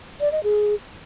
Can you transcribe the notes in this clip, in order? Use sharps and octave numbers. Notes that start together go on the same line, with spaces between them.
D5
D#5
G#4